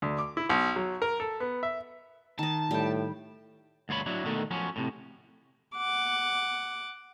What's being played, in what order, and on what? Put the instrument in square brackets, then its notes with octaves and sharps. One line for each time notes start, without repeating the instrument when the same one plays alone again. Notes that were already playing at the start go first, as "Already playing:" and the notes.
[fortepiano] D2
D6
E4
B1
F#3
A#4
A4
B3
E5
[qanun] D#3 D#5 [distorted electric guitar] A5
[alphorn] A2 [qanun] G3 G5
[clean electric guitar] D2 G2 F4 C#5 B5
F#3 D4 E4
B2 D3 D#3 A3
F3 F#3 C#4
A2 C3
[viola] F#5 D6